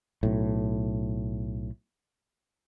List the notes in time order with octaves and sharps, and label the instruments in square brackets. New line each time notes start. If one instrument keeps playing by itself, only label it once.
[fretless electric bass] B1 A2